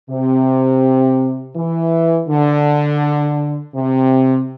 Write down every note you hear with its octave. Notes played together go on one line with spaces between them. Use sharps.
C3
E3
D3
C3